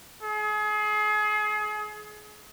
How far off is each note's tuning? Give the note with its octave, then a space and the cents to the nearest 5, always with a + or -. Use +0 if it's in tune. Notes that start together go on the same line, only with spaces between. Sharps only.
G#4 +30